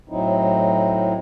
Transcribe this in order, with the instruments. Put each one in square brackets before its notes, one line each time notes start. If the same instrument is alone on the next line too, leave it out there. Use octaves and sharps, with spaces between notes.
[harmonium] A2 F#3 C4 D#4 E4